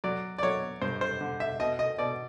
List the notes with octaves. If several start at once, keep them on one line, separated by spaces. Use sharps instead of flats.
F#3 D5
D5
F#3 C#5
G2 C5
C5
D3
E5
B2 D#5
D#5
B2 D5